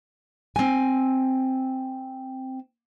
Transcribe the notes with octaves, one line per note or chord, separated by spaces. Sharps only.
C4 G#5